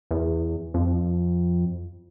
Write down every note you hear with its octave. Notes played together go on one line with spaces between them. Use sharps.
E2
F2